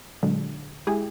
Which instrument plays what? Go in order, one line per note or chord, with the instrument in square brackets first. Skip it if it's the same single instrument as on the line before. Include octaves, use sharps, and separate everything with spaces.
[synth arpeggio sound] A#2 D3 F#3 G#3
G#3 E4 G4 G#4